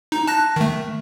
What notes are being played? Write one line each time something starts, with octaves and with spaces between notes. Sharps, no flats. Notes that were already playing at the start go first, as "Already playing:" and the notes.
D#4
A5 F#6 A#6
D#3 A3